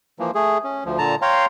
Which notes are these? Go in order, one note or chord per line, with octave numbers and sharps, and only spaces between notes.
E3 F3 A#3
A3 G#4
C#4
D2 F3
A#2 D3 A5 A#5
C#5 F5 G5 A#5 C6